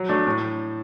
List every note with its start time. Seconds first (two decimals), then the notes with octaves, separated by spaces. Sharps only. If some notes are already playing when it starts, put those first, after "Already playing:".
Already playing: F#3
0.09 A3 D4
0.27 A2